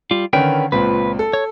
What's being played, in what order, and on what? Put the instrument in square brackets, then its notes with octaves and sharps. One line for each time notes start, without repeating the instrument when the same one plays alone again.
[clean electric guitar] G3 F4
[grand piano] D3 D#3 C#4 [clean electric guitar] A#4 B4 G5
[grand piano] C#2 A#2 C4 [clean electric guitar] B4
[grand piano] A4
[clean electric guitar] C#5